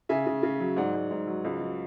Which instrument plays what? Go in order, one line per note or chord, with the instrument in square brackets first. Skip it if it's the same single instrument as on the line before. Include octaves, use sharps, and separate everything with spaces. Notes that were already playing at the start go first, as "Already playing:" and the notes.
[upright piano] C#3 E5 G#5
C#3
C#3
F#3
G#2 D5 F#5
G#2
G#2
F#3
C#2
F#3